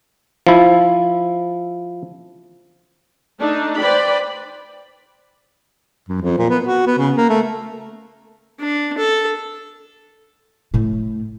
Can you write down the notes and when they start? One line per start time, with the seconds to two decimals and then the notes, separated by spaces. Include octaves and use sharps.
0.47 F3 E4
3.37 A3 D4 D#4
3.79 B4 C5 D5 G5 B5
6.09 F#2
6.22 F2
6.38 A#2
6.50 B3
6.64 F#4
6.86 B3
6.98 C#3
7.17 A#3
7.29 A3
8.60 D4
8.98 A4
10.74 A2 A3